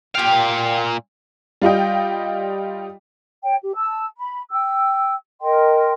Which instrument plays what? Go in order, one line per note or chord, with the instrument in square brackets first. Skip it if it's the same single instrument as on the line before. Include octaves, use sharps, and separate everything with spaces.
[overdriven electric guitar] A#2 F5 [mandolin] G4 G5
[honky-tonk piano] G3 F4 D#5 G5
[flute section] C#5 G5
G4
A5 E6
B5
G5 E6
A#4 D#5 G5 C6